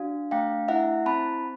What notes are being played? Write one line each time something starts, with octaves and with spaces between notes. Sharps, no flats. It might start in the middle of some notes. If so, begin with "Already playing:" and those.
Already playing: D4 F#4 F5
A3 F5 G5
E4 E5 F#5
C4 A5 B5